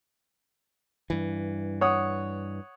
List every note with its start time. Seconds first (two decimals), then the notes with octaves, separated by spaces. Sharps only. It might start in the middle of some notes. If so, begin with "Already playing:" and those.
1.10 G2 E3
1.81 C#5 F#5 D#6